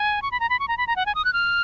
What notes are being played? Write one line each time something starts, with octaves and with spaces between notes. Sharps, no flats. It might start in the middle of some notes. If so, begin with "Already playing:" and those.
Already playing: G#5
C#6
B5
A#5
B5
C#6
A#5
B5
A#5
F#5
G#5
D#6
F#6
F6